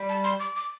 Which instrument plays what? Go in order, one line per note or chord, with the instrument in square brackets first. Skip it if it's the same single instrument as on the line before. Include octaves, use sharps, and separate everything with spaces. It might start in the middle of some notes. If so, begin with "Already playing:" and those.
Already playing: [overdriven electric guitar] G3
[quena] A5
C6
D6
D6